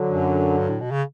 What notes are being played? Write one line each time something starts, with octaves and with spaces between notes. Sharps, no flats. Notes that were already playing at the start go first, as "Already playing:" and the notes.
Already playing: D3 F#3
F#2
G2
A2
B2
C#3